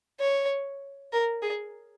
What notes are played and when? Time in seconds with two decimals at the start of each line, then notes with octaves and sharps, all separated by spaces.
0.20 C#5
1.12 A#4
1.42 G#4